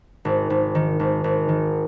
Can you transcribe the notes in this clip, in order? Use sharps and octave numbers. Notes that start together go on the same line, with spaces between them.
G#1
G#1
D#3
G#1
G#1
D#3